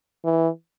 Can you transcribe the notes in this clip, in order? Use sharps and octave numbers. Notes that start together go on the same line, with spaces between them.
E3